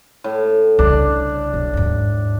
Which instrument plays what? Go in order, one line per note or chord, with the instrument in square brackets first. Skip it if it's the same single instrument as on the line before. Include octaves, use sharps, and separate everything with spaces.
[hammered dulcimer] A2
[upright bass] C2 C#3 [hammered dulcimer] D4
[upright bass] B1
D#2 G#2